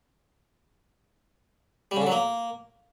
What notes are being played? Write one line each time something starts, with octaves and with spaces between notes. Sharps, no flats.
G3
C#3
D3
F#3
A#3